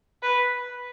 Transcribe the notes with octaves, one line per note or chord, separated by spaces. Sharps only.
B4